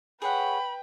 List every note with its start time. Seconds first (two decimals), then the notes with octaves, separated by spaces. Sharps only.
0.22 G#4 B4 C#5 F#5 G5 B5